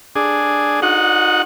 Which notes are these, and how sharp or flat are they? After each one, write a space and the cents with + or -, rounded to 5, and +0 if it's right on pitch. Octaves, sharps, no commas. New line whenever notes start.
D4 +0 G#4 +0
D#4 +0 F#4 -40 F#5 +0